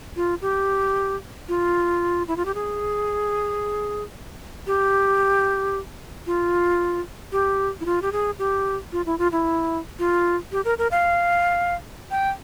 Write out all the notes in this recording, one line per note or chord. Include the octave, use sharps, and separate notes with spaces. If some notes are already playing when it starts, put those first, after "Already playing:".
F4
G4
F4
E4
F4
G4
G#4
G4
F4
G4
E4
F4
G4
G#4
G4
F4
E4
F4
E4
F4
G4
A#4
A#4
F5
G5